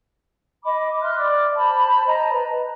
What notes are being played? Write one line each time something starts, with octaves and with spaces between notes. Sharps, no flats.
D#5 B5 D6
E5 C6 F6 F#6
D5 D6
C5 A5 B5
D#5 A5 A#5
B4